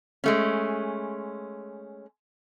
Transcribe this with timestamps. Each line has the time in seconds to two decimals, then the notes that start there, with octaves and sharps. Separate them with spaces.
0.24 G#3 A3 C#4